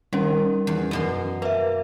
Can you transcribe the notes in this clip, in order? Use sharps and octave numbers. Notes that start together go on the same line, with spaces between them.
D#3 G3 C#4
E2
F#2 B2 C6
A#3 B4 E5